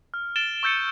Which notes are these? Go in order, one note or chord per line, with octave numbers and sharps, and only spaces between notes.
F6
A6 D7 E7 G7
C#6 E6 G6 A6 C#7 D#7